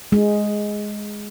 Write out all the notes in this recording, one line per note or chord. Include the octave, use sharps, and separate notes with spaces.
G#3